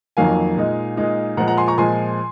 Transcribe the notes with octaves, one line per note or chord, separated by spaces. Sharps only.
F2 D#3 F#3 A#3 F5 G#5
A#2 G#3 D#4
A#2 G#3 D#4
A#2 F3 G#3 F#5 A#5
F#5 A#5
G#5 C6
A#5 C#6
A#2 F3 G#3 G#5 C6